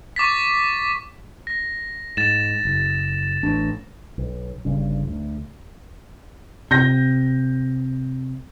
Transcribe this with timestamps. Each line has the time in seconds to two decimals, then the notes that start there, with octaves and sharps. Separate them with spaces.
0.16 C#6 D6 A6 B6
1.47 A#6
2.17 G#2 A6 E7
2.65 F#1
3.43 A1 D4
4.18 B1
4.65 G1 G2 C#3
5.08 D2
6.71 C3 G6 A#6